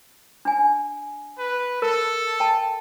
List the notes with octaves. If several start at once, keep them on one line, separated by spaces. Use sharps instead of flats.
D4 G#5
B4
A4 A#4
G5 A5